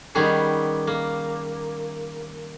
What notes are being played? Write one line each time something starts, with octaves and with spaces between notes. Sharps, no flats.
D#3 G3 B3 C#4 G#4
A#3